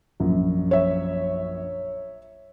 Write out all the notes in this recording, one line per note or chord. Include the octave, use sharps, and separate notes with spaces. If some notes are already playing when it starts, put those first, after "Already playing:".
A#1 F#2
C#5 E5